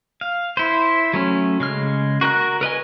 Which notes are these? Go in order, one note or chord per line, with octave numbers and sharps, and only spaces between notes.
F5
E4 C5
F#3 A3 C#4
C#3 G#3 F6
F#4 A#4 G5 F#6
A#4 B4 D#5 G#5